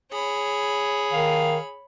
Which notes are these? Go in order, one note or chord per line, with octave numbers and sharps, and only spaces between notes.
G#4 C#5 B5
D#3 F5